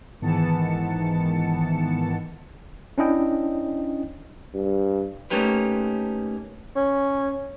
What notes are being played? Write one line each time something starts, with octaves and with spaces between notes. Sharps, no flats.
G#2 D#3 E3 B3 A5 C#7
C#4 D4 E4 D#5 G5
G2
A3 A#3 C#4 D#4 G4 B4
C#4